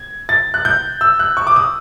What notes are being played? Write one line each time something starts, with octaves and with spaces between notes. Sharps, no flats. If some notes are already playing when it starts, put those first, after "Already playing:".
Already playing: G#6
A6
F#6
G6
E6
F#6
C#6
D6
D#6